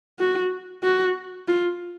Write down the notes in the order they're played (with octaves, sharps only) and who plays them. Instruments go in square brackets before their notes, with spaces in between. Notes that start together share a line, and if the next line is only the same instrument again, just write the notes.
[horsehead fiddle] F#4
F#4
F4